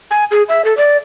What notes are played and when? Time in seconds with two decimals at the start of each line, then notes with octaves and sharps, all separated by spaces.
0.11 G#5
0.31 G#4
0.49 E5
0.65 A4
0.77 D5